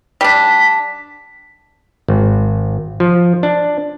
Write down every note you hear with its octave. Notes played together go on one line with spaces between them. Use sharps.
G3 D4 B6
G#1
F3
D4